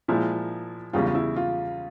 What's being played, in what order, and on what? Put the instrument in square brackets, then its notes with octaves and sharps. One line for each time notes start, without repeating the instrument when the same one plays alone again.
[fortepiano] A#2 F3 G#3 [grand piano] E4
[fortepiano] E2 C#3 G3 [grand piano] F4
[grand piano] F4
E4
F4